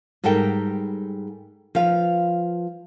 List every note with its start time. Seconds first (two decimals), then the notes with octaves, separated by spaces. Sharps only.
0.24 G#2 G3 A4 A#4 G5
1.75 F3 B4 F5